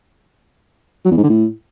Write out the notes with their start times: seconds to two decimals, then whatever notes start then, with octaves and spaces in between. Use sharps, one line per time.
1.05 F#3
1.11 E2
1.17 G#2
1.23 D3
1.29 A2